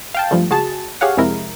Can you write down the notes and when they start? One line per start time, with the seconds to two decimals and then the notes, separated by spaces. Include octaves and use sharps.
0.14 F5 G5 A5
0.31 G2 F3 G3 A3
0.50 C#2 F#4 G#4 A5
1.01 G4 G#4 C#5 F5 F#5
1.17 F2 C3 G#3 E4 A#4